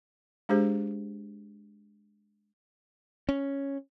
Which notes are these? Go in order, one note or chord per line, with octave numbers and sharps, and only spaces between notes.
G#3 D4 G4 G#4 C5
C#4